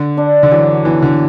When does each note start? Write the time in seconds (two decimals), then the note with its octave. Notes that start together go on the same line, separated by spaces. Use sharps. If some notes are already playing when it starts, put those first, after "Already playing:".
Already playing: D3
0.17 D4
0.43 D3
0.51 E3 F#3
0.85 E3 B3
1.02 D3